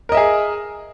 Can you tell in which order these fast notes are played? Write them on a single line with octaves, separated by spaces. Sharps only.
A#4 D#5 E5 G#4